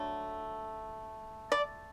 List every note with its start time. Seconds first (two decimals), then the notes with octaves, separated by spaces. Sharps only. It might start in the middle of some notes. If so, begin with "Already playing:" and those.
Already playing: D3 F#3 A3
1.52 D5